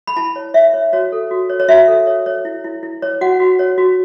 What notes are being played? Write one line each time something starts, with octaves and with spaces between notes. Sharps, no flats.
B5
E4 A5
C#5
C#5 E5
C#5
F#4 C#5
A4
F#4
C#5
C#5
F#4 E5
A4
C#5
C#5
E4
E4
E4
C#5
F#4 F#5
F#4
C#5
F#4